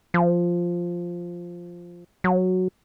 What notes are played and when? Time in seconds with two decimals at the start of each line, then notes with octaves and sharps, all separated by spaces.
0.14 F3
2.24 F#3